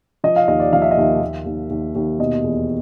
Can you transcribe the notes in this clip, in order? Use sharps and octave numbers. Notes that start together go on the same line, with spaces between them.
F3 D#5
F5
D#2 D#5
D5
F3 F5
E5
D#5
D#2 E5
D#2
D#2
D#2
D#2
B2 D#5
E2